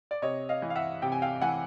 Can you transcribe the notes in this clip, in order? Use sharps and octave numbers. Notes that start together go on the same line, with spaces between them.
D5
C3 C#5 D#5
D#5 F5
E3
F5
E5 F#5
C3 G5
G#5
F5 G5
E3 F#5 G#5